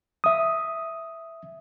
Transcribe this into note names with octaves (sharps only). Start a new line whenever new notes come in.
E5 D#6